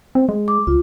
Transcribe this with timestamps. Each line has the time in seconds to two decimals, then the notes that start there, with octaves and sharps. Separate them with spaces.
0.15 C4
0.29 G#3
0.48 D6
0.67 C#2 F4